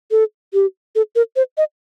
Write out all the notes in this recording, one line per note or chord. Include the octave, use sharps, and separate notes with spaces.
A4
G4
A4
A#4
C5
D#5